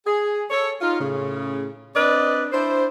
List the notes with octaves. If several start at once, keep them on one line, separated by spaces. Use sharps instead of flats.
G#4
A4 C#5
D#4 F4
A2 C#3
C4 D4 B4 D5 D#5
D4 E4 C5